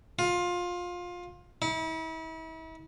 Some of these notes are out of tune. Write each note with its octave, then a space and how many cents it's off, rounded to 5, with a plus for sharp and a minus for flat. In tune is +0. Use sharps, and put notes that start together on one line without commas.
F4 +20
E4 -40